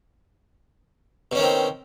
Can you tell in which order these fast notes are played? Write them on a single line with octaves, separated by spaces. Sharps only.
B2 C#4 D#3 C4